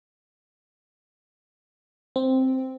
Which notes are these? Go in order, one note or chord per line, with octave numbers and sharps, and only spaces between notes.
C4